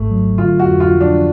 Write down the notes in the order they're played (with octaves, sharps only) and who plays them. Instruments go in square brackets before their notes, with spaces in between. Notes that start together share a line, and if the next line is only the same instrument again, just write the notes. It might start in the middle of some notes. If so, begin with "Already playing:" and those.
Already playing: [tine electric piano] G#1 G#2 [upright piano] A3
[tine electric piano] F#3
[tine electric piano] D3 [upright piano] F4
[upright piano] F#4
[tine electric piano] F2
[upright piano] F4
[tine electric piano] F3
[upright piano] D4